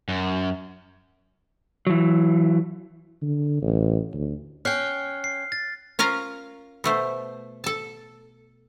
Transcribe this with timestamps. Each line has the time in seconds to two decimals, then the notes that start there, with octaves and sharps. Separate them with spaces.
0.08 F#2
1.87 E3 F#3
3.22 D3
3.62 A1
4.14 D2
4.65 C#4 G5 F6 F#6 C7
5.24 C7
5.52 A6
5.99 C#4 F4 A#4 F5 A#5
6.84 B2 A3 C5
7.64 A4 A5